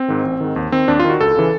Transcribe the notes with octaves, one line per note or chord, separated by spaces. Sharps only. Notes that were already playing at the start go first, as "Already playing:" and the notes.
Already playing: C4
G#2 D#3
A1
G#2 D#3
D#2
D#3 C4
D#2 D4
D#3 F4
F#4
C#2 A4
C#3 E3